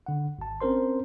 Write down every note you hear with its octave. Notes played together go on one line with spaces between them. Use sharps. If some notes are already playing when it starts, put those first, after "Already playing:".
D3 F#5
G#1 A5
C4 C#4 A#4 C5 C6